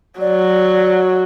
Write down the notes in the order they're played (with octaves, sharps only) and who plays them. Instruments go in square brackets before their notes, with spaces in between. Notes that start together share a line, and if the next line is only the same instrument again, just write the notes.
[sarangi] F#3 [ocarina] D5